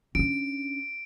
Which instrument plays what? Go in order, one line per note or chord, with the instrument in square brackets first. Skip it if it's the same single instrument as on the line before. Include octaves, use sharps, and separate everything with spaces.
[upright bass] C#4 D4 [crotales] D7